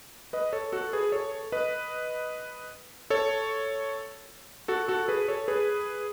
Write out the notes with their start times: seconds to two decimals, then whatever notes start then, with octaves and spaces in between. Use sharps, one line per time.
0.33 B4 D#5
0.53 A4 C#5
0.73 F#4 A4
0.93 G#4 B4
1.12 A4 C#5
1.52 B4 D#5
3.10 A4 C#5
4.68 F#4 A4
4.88 F#4 A4
5.08 G#4 B4
5.28 A4 C#5
5.48 G#4 B4